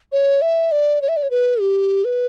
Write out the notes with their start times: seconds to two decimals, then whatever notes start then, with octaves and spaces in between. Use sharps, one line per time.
0.12 C#5
0.42 E5
0.72 D5
1.02 C#5
1.08 E5
1.17 D5
1.23 C#5
1.30 B4
1.61 G4
2.04 B4